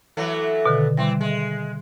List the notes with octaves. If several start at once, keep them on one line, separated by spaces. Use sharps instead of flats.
E3 F#3 A3
B2 D3 D#3
E3 G3 C4
G#3